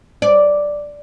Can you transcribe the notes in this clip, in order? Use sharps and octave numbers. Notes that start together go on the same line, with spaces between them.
D5